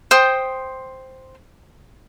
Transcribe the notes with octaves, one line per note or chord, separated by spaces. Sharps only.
C5 G5 D#6